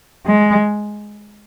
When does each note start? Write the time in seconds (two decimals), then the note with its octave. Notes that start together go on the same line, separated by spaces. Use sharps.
0.26 G#3